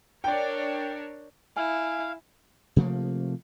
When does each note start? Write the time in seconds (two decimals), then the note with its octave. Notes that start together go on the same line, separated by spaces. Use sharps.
0.24 D4 A#4 C#5 D5 G5
1.57 E4 F5 G#5
2.76 C3 F3 A3 A#3